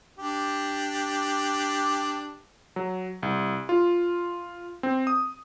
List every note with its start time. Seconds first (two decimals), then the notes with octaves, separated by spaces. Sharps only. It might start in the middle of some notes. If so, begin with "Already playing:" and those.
0.18 D4 G4
2.76 F#3
3.23 C2
3.69 F4
4.83 C4
5.07 D#6